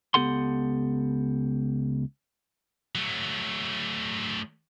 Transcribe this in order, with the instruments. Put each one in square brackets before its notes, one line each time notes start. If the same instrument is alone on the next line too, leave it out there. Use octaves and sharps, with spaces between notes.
[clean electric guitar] C#2 B3 G4 A4 F#5 C6
[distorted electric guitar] F#3 A3